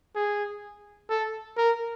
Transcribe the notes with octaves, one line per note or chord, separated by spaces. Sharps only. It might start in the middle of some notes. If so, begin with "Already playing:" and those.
G#4
A4
A#4